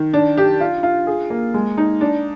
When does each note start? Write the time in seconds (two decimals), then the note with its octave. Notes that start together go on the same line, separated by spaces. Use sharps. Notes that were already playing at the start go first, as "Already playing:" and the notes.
Already playing: D#3
0.13 D4
0.37 G4
0.60 F4
0.83 F4
1.07 G#4
1.30 A#3
1.54 G#3
1.77 D#4
2.01 D4